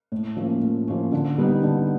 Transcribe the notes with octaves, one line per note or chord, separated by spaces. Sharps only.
A2
F3 A#3 C#4
A2
F3 A#3 C#4
D3
G3 B3 D#4
D3